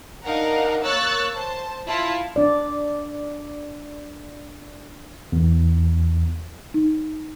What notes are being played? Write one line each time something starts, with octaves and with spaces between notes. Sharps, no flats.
D4 D#4 A#4 F5 F#5 A#5
A#3 C#5 C#6 E6 F#6 A6
C5 A5
E4 F4 A5
D4 D5
E2
D#4